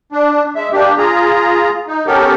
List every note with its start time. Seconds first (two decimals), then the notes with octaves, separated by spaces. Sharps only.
0.12 D4
0.55 G#3 E5
0.73 A#3 D4 G4
0.98 F4 G#4 A#5
1.87 D#4
2.07 B3 C#4 G4 A4 A#4